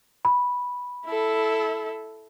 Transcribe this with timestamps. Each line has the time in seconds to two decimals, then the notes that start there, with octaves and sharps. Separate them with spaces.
0.25 B5
1.06 E4 A4